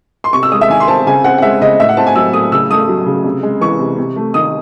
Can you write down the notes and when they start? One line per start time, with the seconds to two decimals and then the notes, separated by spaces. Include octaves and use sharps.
0.24 C6
0.33 C3 C#6
0.43 E6
0.52 G#3 D#6
0.61 E5
0.70 D#3 G#5
0.80 C6
0.88 C4 A5
1.07 C#3 G#5
1.24 C4 F#5
1.38 F#5
1.42 G#3 E5
1.61 C#3 D#5
1.79 A2 E5
1.89 F#5
1.97 C4 A5
2.06 G#5
2.16 F#3 E6
2.34 A2 D#6
2.52 C#3 E6
2.71 A3 D#6
2.89 F#3
3.06 C#3
3.24 C3
3.43 G#3
3.61 E3 C#6
3.79 C3
3.98 C3
4.16 A3
4.34 D#3 D#6